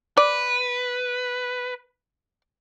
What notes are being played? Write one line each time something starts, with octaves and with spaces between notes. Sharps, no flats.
B4 D5